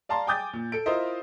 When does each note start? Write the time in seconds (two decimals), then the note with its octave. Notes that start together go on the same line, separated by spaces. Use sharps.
0.09 D5 F5 A5 A#5 C6
0.27 G5 G#5 D6 D#6 G6 A6
0.53 A#2
0.72 A4 D7
0.86 E4 F4 A#4 C5 D#5 E5